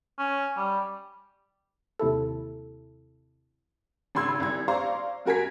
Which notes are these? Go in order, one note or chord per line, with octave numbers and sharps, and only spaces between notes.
C#4
G3
D#2 C3 E4 A4
G#1 C#3 B5 C6 E6 G#6
C2 G#6
C5 D5 F5 A#5 C6 C#6
F#2 F#4 A#4 G#5 G#6 B6